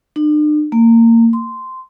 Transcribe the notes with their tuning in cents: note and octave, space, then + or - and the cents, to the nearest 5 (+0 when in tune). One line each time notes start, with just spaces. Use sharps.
D4 +45
A#3 -25
C6 -10